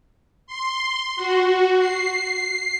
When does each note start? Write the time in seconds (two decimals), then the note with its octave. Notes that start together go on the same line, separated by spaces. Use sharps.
0.47 C6
1.16 F#4
1.78 C7